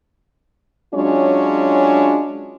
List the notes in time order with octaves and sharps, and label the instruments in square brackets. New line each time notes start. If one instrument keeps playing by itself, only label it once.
[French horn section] F#3 G#3 C#4 D4 F4 C#5